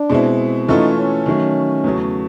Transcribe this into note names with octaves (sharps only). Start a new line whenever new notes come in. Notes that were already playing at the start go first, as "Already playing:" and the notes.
Already playing: D4
B2 G#3 C4 E4
E3 A3 C#4 D#4 F4 A4
C#4
D#3 F#3 A3
E2 C#3 F#3 A3